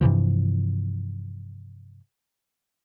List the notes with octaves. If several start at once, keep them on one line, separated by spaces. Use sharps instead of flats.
G2 C3 E3 F3